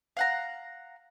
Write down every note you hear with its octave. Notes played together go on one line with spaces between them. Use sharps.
F5 F#5 A#5